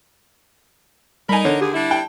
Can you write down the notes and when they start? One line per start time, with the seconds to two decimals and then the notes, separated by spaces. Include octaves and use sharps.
1.29 G3 D#4 A#4 G#5 B5
1.45 D3 C#5
1.61 D#2 G4 G#4
1.74 G3 D4 E4
1.91 G5 A5